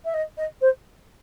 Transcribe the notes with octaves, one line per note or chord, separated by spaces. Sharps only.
E5
D#5
D#5
C5